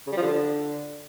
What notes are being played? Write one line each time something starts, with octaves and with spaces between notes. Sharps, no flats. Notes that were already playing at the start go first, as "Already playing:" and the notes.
C#3
G3
F3
D3